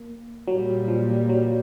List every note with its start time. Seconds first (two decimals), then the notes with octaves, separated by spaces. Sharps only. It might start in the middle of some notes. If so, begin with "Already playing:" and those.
Already playing: A#3
0.47 A#2 F#3 G3 A#3
0.88 F3
1.29 F#3